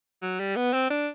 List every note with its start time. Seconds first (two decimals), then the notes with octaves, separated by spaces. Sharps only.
0.22 F#3
0.40 G3
0.56 B3
0.74 C4
0.90 D4